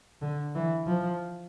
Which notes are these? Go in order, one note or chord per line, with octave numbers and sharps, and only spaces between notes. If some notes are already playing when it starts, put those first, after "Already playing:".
D3
E3
F3